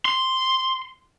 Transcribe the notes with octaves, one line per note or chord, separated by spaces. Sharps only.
C6